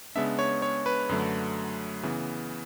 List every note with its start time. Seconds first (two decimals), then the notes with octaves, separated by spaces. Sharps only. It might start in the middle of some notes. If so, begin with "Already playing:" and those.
0.16 C#3 G#3 B3 D4 E5
0.39 C#5
0.62 C#5
0.86 B4
1.09 F#2 D3 F#3 A3
2.03 C#3 E3 B3